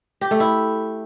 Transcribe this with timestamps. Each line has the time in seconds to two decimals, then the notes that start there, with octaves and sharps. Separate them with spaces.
0.21 G4
0.31 A3
0.40 E4